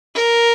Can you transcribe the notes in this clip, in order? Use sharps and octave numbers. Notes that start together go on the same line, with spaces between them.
A#4